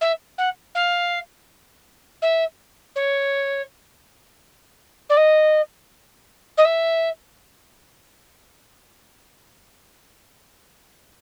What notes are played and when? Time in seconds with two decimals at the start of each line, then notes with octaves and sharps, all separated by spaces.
0.01 E5
0.38 F#5
0.75 F5
2.22 E5
2.96 C#5
5.10 D5
5.17 D#5
6.57 D#5
6.65 E5